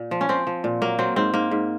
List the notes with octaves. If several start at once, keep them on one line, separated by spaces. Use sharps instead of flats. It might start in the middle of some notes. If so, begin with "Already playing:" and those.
Already playing: A#2
F3
C#4
F3 C4
F3
A#2
F#3 A#3
F#3 C4
G#2 C4
G#2 A#3
G#2